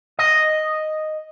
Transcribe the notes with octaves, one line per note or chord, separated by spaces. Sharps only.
D#5